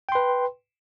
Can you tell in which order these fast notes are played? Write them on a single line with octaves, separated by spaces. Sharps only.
G5 C6 B4